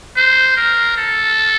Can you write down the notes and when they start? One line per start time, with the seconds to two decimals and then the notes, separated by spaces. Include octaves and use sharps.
0.17 C5
0.57 A#4
0.97 A4